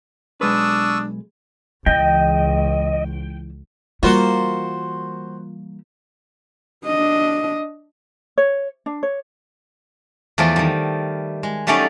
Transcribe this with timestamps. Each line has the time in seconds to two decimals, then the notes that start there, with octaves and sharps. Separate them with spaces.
0.41 B1 G#3 D4 B4 C#6 D#6 E6
1.86 C#2 E3 D#5 G5
4.03 E3 G3 A#3 F4 F#4 C5
6.86 D4 D#5
8.38 C#5
8.86 D4
9.03 C#5
10.38 E2 F3 A3 A#4 D5 C6
10.56 D#3 G3
11.43 G#3
11.67 F#3 G3 A3 C#4 D#4 D5